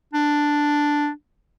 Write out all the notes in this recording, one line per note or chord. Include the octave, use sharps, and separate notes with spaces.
D4